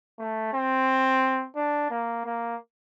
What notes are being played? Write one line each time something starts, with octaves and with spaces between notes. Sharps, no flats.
A3
C4
D4
A#3
A#3